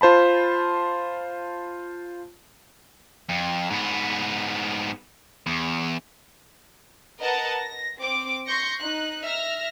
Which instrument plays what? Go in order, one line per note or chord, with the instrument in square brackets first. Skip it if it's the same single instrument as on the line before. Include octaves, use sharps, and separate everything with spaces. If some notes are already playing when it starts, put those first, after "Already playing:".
[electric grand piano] F4 C5 A5 B5
[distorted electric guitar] F2
G#2 B3
E2
[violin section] A#4 B4 D#5 F#5 A5 A#5
A#6
C4 D6
C6 C#6 G6 A#6 C#7
D#4 F#6
E5 F6 A#6